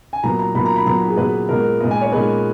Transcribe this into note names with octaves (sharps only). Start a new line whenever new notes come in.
G#5
A#2 F#3 B3 A#5
A#5
A#2 F#3 B3 B5
A#5
B5
A#2 F#3 B3 A#5
G#4
A#2 F#3 B3 B4
A#2 G#3 B3 A#4
A#2 G#3 B3 D#5
G#5
C#5
A#2 G#3 B3 B4